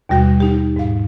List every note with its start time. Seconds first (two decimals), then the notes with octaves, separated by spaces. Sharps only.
0.09 D#2 B2 G3 F#4 G6
0.40 D#4 G4
0.76 G#2 F5